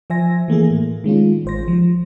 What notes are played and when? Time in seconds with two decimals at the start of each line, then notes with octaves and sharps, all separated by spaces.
0.10 F3 C5 E5 G#5 A#6
0.48 E3 A3 A#3 G#4
0.70 A2
1.04 D#3 G#3 C#4 F4
1.45 A1 C5 A#6
1.68 F3